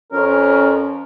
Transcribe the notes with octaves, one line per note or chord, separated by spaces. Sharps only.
F2 C#4 A#4